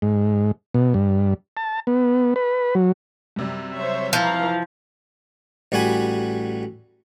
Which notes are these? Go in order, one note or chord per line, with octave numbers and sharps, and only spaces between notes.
G#2
B2
G2
A5
B3
B4
F#3
F#2 C3 G3
C5 C#5 E5
E3 F3 F5 A#5
A1 G3 F#4 G#5 B5